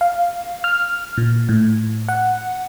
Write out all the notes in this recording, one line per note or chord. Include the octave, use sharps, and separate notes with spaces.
F5
F6
A#2
A2
F#5